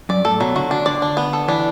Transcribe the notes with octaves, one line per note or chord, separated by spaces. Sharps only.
F#2 D5
A2 A4
B2 F#3
D3 F#4
D3 D4
D3 D5
D4
B3
A4
E3 D4